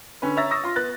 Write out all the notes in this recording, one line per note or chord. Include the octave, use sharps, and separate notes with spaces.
D3 C#4 B4
C#5 E5 A#5 E6 A6 A#6
C#6 D#6 E6 A#6
F4 C6
B3 F#6 A6